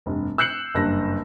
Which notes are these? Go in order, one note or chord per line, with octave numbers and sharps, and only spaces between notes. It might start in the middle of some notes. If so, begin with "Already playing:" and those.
F1 G2
E6 F#6 G6 C7 C#7 F#7
F#1 G2 A#6